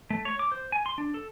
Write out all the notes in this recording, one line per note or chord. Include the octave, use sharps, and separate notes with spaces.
A3
C#5
D6
C5
G#5
C6
D4
A4